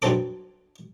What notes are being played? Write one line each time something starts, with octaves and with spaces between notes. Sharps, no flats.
G2 F#3 C4 A4 D6